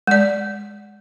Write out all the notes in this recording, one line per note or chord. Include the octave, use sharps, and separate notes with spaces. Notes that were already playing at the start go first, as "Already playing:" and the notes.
G#3 D5